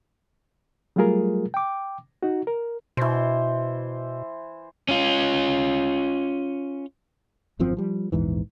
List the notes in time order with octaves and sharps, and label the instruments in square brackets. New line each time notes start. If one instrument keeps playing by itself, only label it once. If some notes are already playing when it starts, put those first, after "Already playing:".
[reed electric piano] F#3 G3 A3 F4 G#4 A#4
G5 D6
D#4 F#4
A#4
[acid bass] B2 [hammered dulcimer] E3 C5
[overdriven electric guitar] C#4 F4
[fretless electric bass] G#1 F#2 F3 C4
F3 G3
A#1 E2 G#2 E3